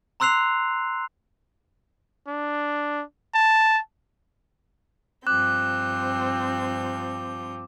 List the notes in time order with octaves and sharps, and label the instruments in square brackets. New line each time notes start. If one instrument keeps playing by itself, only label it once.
[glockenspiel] A#5 C6 E6 F#6 C7 F7
[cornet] D4
A5
[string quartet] G2 F3 G6 [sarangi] C4 [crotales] D6 [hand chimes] F#6